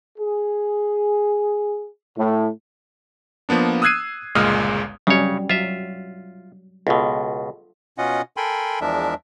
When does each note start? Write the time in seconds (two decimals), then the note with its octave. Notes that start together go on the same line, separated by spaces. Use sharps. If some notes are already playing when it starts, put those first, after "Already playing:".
0.18 G#4
2.18 A2
3.49 F3 A#3 B3 D4
3.82 D#6 E6 F#6 G#6 C7 D#7
4.35 G1 C#2 A#2 G#3 D#6 F6
5.07 C#3 F#3 G3 C#4 C#5
5.50 F#3 F4 E5
6.87 C#2 B2 F4 A4
7.98 B2 C#4 F4 D#5 F#5
8.37 A4 A#4 G5 G#5 B5 C6
8.81 E2 F3 G#3 D4 A#4 E5